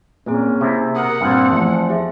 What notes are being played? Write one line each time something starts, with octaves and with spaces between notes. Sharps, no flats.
A#2 A#3 C4 C#4 G#4
C3 E4
A#4 F#5 D#6
G2 A#2 C4
E2 F3 A3 A5
G4 G#4 E5